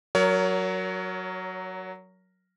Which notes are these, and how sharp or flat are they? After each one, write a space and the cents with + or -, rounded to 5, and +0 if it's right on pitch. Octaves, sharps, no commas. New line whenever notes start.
F#3 +0 A#4 +0 C#5 +30